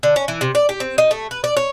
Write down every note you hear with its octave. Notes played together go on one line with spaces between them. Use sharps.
D3
C#4
E3
C3
D5
G4
C4
D#4
A3
B4
D5
C#5